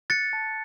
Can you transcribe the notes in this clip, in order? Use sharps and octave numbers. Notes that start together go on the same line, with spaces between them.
F#6 A6 C#7
A5